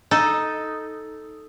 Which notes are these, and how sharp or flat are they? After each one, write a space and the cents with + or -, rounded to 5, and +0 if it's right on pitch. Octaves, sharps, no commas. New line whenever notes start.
D#4 +0 A4 +0